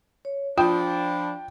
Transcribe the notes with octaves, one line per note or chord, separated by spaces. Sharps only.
C#5
F3 D4 F4 G5 B5